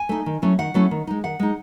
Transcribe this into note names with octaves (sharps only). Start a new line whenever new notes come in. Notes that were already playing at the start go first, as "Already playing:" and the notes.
Already playing: G#5
A3 D#4
D#3
F#3 A3 C#4 E4
D#3 F#5
F#3 A3 C#4 E4
D#3
G#3 D#4
D#3 F#5
G#3 D#4